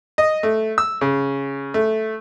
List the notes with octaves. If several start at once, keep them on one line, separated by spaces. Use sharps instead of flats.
D#5
A3
E6
C#3
A3